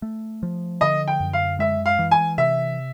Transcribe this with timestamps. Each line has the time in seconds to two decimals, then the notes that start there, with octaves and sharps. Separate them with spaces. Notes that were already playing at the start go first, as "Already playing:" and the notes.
0.02 A3
0.43 F3
0.81 D3 D#5
1.08 G5
1.20 F#2
1.33 F5
1.59 G#3 E5
1.86 F5
1.99 E3
2.11 G#5
2.38 C3 E5